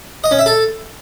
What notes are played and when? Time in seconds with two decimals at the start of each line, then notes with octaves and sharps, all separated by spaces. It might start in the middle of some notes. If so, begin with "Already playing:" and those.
0.24 D#5
0.31 C#4
0.39 E5
0.46 A4